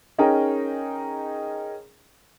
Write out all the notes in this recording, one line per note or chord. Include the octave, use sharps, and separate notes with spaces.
C#4 D#4 G#4 A#4 G5 A#5